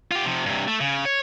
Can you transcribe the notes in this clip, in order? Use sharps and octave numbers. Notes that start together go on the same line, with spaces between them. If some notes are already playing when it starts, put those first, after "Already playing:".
F4 G4
C3 F3
G2 C3
A3
C#3
C#5